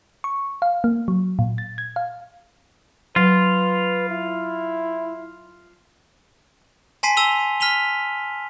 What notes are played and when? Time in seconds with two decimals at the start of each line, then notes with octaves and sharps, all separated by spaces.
0.24 C#6
0.62 F5
0.84 A#3
1.08 F#3
1.39 A#2
1.58 A6
1.78 G#6
1.96 F5
3.16 F#3 F4 B4
4.09 E4
7.03 G#5 A5 C6 B6 C7 D#7
7.17 A5 E6 D#7 F7 G7
7.60 F6 B6 D#7 F7 G7